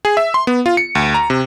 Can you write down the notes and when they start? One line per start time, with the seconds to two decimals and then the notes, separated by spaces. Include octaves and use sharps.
0.05 G#4
0.17 E5
0.34 C6
0.47 B3
0.66 F4
0.77 C#7
0.95 D2
1.14 A#5
1.30 C3